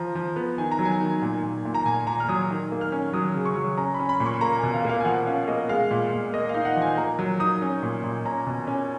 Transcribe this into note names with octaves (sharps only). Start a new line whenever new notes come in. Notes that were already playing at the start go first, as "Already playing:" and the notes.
Already playing: F3 A#5
F3
B3
D#3 G#5
A#5
F#3
G#5
D#3
A#2
A#2
A#2
A#5
A#2 G#5
A#2 A#5
F6
F#3 D#6
D#3
A#3
F6
C#4
F#3 D#6
C#3
C#6
F#3
C#4 A#5
C#4 B5
B5
A#2
C#6
A#3 A#5
G#5
B2
F5
A#3 F5
G#5
F3 F#5
C#4 F5
A#3 D#5
G#3 F5
A#2
A#2
A#3 D#5
D#4 F5
F#5
F3
G#5
A#3 A#5
F#3
D#4 D#6
C#4
A#2
A#2
C#4 A#5
B2
C#4